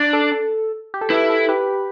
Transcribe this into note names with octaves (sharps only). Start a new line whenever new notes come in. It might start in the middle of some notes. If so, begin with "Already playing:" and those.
Already playing: D4
A4
A4
G4
A4
E4 G4 B4
A4
G4 B4